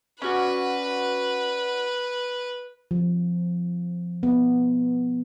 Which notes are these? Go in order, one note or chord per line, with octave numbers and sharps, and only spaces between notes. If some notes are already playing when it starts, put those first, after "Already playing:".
C#4 F#4 B4 D5
F3
B3